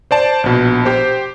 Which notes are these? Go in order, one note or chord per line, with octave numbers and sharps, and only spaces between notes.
C5 D5 A5
A#1 B2
G4 C5